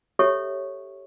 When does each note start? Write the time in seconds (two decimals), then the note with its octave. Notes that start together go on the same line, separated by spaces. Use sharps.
0.19 G4 A4 C#5 E5 C#6